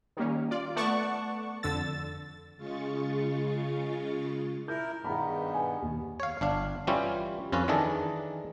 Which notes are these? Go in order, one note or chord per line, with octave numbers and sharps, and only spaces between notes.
D#3 G3 A#3 C#4
F4 D5
A3 B3 D5 F#5 A5 C#6
F2 D3 E6 A6
C#3 G#3 F4 C#6 A6
E4 A#4 G6
G2 D#3 B3 G#4 A#5 B5
G#5
D#2
C#5 F5
G1 D4 F5
E3 G3 C#4 E4 F4 G4
F2 C#4 F4 B4
D#3 E3 D4 G#4 A4